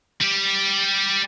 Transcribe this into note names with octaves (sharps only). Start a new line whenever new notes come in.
G3 G4